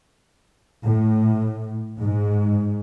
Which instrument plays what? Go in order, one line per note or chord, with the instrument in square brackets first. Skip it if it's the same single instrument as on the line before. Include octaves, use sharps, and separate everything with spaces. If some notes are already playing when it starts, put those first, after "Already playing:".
[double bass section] A2
G#2